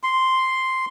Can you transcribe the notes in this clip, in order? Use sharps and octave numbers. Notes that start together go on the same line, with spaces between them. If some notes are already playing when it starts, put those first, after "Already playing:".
C6